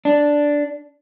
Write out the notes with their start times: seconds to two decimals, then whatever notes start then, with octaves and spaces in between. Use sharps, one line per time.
0.05 D4